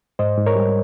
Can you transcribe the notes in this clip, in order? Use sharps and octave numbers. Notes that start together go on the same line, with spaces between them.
G#2 C5 D#5
G#2
A#4 C#5
G3